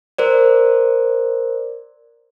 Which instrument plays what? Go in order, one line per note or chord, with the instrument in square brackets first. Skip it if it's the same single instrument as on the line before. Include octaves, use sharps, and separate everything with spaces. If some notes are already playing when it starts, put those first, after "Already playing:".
[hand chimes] A#4 C5 D5